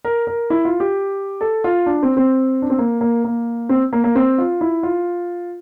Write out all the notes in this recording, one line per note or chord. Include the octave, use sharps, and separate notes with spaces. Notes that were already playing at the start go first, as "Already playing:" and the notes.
A#4
A#4
E4
F4
G4
A4
F4
D4
C4
C4
D4
C4
A#3
A#3
A#3
C4
A#3
A#3
C4
F4
E4
F4